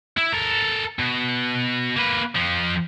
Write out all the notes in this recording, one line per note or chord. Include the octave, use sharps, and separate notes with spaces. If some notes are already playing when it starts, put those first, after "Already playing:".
E4
A4 A#4
B2
A#3 B4
F2 F3